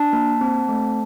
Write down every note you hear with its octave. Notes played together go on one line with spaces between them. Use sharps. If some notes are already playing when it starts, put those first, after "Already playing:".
Already playing: D4 A5
A#3
C4
A3